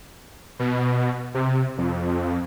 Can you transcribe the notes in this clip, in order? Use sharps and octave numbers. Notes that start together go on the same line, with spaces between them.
B2
C3
F2